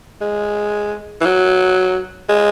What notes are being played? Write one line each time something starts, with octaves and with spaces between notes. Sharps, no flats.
G#3
E3
F#3
G#3